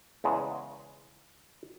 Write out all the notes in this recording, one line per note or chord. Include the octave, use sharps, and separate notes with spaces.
E2 C#3 G#3